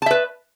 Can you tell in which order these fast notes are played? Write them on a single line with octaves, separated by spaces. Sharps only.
A5 E5 B4